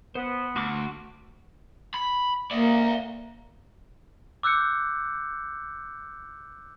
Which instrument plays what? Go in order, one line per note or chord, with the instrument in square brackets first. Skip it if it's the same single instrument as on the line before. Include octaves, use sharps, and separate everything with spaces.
[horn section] B3 [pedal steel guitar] C5
[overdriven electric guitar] D2 [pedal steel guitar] F#4 C6 D6
[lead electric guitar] B5
[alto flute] A#3 [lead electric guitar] D5 E5
[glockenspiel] D6 E6 F#6 G6 C#7